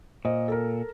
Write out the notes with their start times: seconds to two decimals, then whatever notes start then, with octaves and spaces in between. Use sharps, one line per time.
0.25 A#2 C5 D#5
0.48 A4 A#4